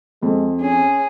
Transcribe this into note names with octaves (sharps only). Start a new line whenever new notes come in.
F2 G#3
C#4 G#4